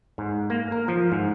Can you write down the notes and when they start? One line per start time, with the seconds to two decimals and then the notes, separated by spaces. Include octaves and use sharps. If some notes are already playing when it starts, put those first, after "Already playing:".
0.18 G#2
0.50 A#3
0.72 A#4
0.88 F3
1.12 G#2